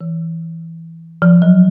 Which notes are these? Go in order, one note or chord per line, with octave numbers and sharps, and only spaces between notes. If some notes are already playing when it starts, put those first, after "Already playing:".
E3
F3
F#3